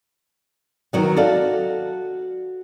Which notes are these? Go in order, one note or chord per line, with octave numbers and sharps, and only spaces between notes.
D#3 F#3 B3
F#4 A4 D5 D#5 F5